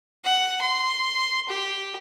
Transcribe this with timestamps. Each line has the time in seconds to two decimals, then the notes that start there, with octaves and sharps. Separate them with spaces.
0.24 F#5
0.62 C6
1.48 G4